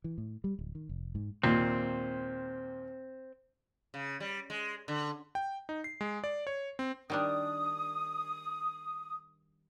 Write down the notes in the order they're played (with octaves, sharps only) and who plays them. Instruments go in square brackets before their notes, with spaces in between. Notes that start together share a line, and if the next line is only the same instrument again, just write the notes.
[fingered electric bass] E3
A2
G3
D1
D#3
F1
G#2
[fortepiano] D#2 A#2 [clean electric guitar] C4
[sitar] C#3
G3
G#3
D3
[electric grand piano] G5
D#4
C7
G#3
D5
C#5
C4
[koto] D#3 G3 D4 [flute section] D#6